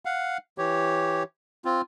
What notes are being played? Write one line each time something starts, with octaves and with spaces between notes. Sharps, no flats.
F5 F#5
E3 G4 C#5
C4 F4